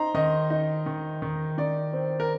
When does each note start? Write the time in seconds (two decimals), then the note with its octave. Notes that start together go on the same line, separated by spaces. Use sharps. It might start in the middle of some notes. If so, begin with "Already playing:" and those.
Already playing: C4 D#4 A#5 C6
0.14 D#3 D#5
0.50 D#4
0.86 D#3
1.22 D#3
1.58 D#3 D5
1.93 C4
2.20 A#4